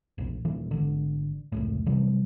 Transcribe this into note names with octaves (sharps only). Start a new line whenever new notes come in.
E1 A#1
D#1 A#2 D#3 E3
G#1 D3
F1 C#2 A2
C3 E3 F#3 G3